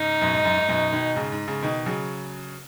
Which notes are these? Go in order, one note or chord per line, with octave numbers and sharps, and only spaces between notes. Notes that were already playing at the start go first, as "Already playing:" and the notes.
Already playing: G#2 C#3 D#4
F#2 B2
G#2
F#2
G#2
F#2 B2
B2 D#3
G#2 C#3
G#2
G#2 C#3
B2 D#3
C#3 F#3